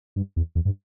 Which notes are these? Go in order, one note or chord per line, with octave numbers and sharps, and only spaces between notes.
G2
E2
E2
G2